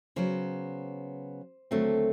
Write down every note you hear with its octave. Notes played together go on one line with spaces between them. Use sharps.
C#3 F#3 B3 C5
D#2 D3 F#3 A3 C4